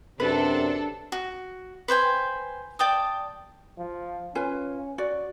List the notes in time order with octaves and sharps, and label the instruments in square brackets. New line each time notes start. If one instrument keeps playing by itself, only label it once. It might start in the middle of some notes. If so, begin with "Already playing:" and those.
[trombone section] F#2 C3 [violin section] D4 A4 [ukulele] B4
[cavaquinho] F#4
B4 C5 G5 G#5
D5 G5 A5 D#6
[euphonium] F3
[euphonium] C#4 [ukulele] F4 B4 G#5
[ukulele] F#4 D5